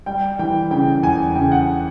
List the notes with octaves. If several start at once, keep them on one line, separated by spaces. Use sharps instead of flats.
G3 G5
E3 G5
C#3 G5
E2 G#5
C#3 G5
F#5